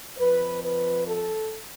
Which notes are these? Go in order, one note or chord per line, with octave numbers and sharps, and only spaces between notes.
F2 F3 B4
B4
A4